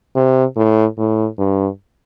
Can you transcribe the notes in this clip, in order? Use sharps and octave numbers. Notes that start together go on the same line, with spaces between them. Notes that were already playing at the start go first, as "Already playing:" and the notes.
C3
A2
A2
G2